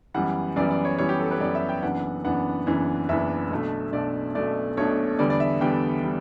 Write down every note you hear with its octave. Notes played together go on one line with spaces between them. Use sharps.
F#2 E3 G3 B3 F#5
F#2 E3 G3 B3 D5
D5
C#5
F#2 E3 G3 B3 C#5
G4
A4
B4
F#2 E3 G3 B3 D5
E5
G5
F#1 F#2 E3 B3 D4 F#5
F#1 F#2 E3 B3 D4 F#5
F#1 F#2 E3 B3 D4
F#1 F#2 E3 B3 D4 E5
B1 B2 A3 D4
B1 B2 A3 D4 D5
B1 B2 A3 D4 D5
B1 B2 A3 D4 C#5
E2 D3 G3 B3 D5
D5
E5
E2 D3 G3 B3 G5
D3 G3